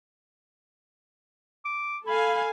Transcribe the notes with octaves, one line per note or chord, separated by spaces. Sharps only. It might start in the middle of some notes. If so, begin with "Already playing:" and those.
D6
A4 F5 G#5 B5